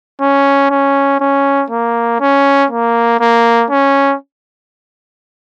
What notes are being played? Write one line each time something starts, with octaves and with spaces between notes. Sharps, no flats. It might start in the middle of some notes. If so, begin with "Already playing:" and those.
C#4
C#4
C#4
A#3
C#4
A#3
A#3
C#4